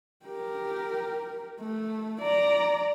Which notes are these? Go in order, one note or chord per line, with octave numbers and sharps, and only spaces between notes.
G4 A#4
A3
D5 A#5